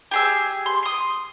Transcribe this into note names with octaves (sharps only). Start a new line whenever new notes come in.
G4 G#4 E6
C6
C6 D#6